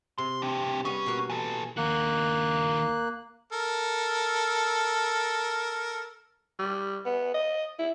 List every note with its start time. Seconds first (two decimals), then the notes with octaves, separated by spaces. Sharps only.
0.18 C3 C6
0.42 C4 D4
0.85 G3 B3 C#4 D#5
1.06 B2 A#3 F#4
1.30 E3 A4
1.77 D#2 A#3 F#4 F#6
3.52 A4 A#4
6.59 G3
7.06 B3
7.34 D#5
7.79 E4